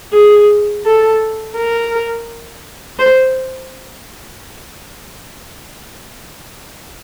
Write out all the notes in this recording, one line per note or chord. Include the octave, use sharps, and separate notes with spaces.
G#4
A4
A#4
C5